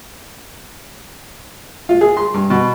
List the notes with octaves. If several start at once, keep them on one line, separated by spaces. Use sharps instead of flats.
F4
G#4
C6
G2
B2